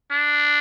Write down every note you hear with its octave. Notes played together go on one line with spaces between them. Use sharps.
D4